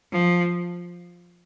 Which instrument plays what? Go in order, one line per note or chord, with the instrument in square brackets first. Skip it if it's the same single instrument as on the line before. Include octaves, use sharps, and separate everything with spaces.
[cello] F3